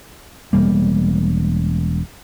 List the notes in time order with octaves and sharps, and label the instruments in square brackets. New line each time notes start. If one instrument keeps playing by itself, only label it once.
[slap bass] E1 G3 A#3